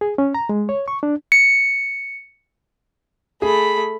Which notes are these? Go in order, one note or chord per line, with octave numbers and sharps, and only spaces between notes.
G#4
C#4
A#5
G#3
C#5
C#6
D4
C#7
A3 G#4 B5